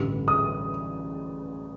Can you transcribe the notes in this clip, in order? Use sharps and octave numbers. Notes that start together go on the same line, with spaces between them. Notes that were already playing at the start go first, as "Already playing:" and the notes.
Already playing: A1 G2 D3 G3
D#6